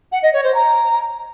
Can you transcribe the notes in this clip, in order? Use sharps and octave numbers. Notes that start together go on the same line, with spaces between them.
F#5
D#5
C#5
C5
A#5